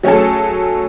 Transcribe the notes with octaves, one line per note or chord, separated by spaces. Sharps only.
F#3 A3 C#4 G#4 A4